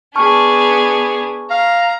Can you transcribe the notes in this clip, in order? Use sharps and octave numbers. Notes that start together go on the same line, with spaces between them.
B3 D4 G#4 A5 C#6 F6
F5 A#5